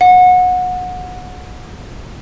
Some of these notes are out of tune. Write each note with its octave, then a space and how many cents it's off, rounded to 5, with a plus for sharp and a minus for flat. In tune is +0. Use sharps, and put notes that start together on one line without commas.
F#5 -25